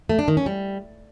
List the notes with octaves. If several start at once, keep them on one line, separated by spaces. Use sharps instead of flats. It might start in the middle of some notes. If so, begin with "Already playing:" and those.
A3
D4
D#3
C#4
G3